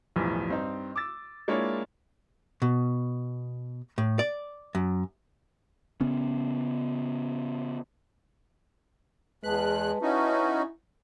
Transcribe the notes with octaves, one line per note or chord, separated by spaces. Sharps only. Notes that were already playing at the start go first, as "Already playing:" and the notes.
B1 E2 A2 E3 F3 G3
G2 C4 D#4
D6 E6 A6
G#3 A#3 D4 E4 F4 C#5
B2
A2
D5
F#2
C#3 B3 C#4
E2 G#3 B4 A5 F#6
C#4 D#4 E4 F#4